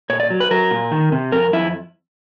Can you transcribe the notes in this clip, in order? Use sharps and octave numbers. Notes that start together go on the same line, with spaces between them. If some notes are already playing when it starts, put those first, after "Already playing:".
A#2 C#5
D5
F#3
B4
F#3 A#4
A#2
D#3
C3
F2 A#4
F2 E4